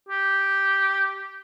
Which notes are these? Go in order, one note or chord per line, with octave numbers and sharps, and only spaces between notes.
G4